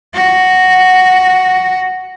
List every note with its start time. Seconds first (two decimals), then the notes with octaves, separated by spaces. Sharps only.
0.14 F#4